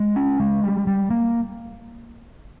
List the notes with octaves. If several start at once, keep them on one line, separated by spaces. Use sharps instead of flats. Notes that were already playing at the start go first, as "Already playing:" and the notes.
Already playing: G#3
C#4
G#3
G3
G3
A#3